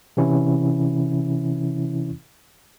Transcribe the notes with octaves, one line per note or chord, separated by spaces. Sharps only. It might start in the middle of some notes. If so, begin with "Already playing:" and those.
C3 E3 C#4 E4